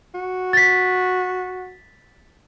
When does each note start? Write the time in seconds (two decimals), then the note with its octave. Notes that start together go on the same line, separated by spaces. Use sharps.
0.15 F#4
0.53 A6 B6